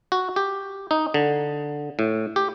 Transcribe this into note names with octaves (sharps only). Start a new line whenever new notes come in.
F#4
G4
D#4
D3
A2
G4